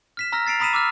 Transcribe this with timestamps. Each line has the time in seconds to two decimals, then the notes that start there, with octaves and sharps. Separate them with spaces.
0.17 F6 B6 E7
0.32 A#5 E6 F6 A#6
0.47 A6 C7 D7 F7
0.60 A#5 B5 D#6 B6 D#7 E7
0.73 D6 E6 F6